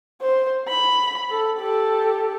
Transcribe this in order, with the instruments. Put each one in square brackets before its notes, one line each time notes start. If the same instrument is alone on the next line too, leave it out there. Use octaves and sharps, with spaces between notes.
[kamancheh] C5
B5
A4
G4 A4